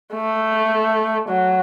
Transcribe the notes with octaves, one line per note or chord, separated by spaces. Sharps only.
A3
F#3